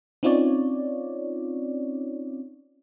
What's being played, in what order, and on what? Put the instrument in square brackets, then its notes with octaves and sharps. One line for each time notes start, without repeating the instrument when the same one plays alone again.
[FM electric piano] C4 C#4 D#4 F4 C#5 D5